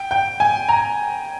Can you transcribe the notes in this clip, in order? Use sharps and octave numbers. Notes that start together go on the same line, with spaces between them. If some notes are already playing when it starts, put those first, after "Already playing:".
Already playing: G5
G5
G#5
A#5